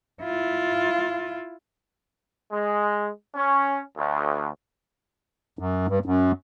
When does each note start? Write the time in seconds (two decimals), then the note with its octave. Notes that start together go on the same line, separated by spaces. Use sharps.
0.23 E4 F4
2.51 G#3
3.35 C#4
3.97 D2
5.59 F#2
5.88 G2
6.06 F#2